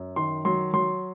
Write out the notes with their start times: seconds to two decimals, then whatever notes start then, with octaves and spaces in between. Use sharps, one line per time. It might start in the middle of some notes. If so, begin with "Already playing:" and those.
Already playing: F#2
0.16 D#3 C6
0.45 F#3 C6
0.73 F#3 C6